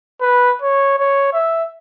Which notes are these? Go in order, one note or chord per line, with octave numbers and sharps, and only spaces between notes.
B4
C#5
C#5
E5